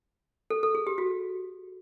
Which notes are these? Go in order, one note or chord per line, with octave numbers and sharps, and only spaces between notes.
A4
A4
G#4
G4
F#4